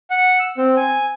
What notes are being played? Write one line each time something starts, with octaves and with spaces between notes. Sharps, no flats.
F#5
E6
C4
G#5